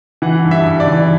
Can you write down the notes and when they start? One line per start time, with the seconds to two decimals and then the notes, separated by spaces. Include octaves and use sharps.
0.22 E3 F#5
0.44 G2
0.51 E5
0.65 G2
0.80 D5
0.87 E3